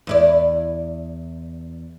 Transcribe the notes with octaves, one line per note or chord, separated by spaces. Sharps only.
E2 E4 D5